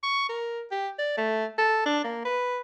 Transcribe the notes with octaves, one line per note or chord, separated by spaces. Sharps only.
C#6
A#4
G4
D5
A3
A4
D4
A#3
B4